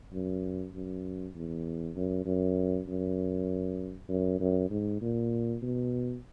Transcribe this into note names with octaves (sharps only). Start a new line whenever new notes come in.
F#2
F#2
E2
F#2
F#2
F#2
F#2
F#2
G#2
A#2
B2